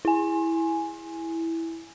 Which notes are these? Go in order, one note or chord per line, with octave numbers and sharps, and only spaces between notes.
E4 G#5